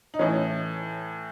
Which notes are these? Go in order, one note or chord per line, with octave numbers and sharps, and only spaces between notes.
D#4
A2 E3 C#4